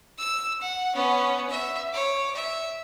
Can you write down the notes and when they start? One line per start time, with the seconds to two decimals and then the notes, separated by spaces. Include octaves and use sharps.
0.18 E6
0.62 F#5
0.94 B3 C#4
1.50 E5
1.93 C#5 D6
2.35 E5